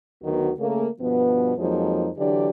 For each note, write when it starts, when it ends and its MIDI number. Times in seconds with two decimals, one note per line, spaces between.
0.23 0.51 38
0.23 0.51 51
0.23 0.51 54
0.23 0.51 59
0.23 0.51 66
0.59 0.87 49
0.59 0.87 57
0.59 0.87 58
1.00 1.55 43
1.00 1.55 47
1.00 1.55 53
1.00 1.55 59
1.58 2.09 41
1.58 2.09 53
1.58 2.09 54
1.58 2.09 56
1.58 2.09 58
1.58 2.09 63
2.17 2.49 50
2.17 2.49 52
2.17 2.49 54
2.17 2.49 62
2.17 2.49 67
2.17 2.49 74